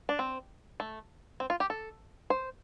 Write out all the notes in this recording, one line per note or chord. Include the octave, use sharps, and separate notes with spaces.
D4
C4
A3
C4
F4
G4
A4
C5